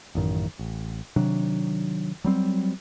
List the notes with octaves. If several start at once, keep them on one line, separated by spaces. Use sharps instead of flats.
A1 F#2 D#3
A1
C3 D#3 F#3 D4
F#3 G3 C4